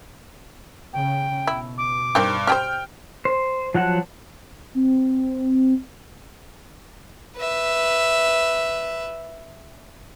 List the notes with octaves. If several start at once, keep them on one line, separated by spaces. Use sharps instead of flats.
C#3 G5
B2 E4
D6
G2 D#3 C4 G4
G4 G#4 C5 G5 F6
C5
F3 F#3 F#4 F#5 A5
C4
B4 E5